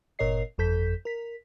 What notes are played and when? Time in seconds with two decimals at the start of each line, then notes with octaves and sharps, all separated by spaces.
0.19 G1 A#2 A#4 C#5 D#5 C7
0.58 G1 F2 A4 G6 B6
1.05 A#4 B6